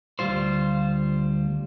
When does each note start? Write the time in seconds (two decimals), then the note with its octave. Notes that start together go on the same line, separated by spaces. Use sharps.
0.19 D2 G3 F4 C5